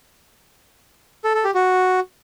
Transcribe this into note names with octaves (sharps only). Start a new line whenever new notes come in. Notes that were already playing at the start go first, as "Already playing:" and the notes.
A4
A4
G4
F#4